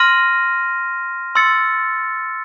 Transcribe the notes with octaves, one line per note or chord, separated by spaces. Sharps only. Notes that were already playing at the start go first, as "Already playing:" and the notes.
Already playing: C6 F6 A#6 D#7
C6 E6 A6 C#7